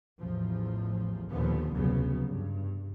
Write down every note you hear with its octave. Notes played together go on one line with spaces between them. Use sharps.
A1 E2 F3
D#2 A#2 D3 F3 B3
F1 D2 C#3 F#3 B3
G2